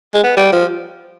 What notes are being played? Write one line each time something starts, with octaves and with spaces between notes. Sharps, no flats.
G#3
B3
G3
F3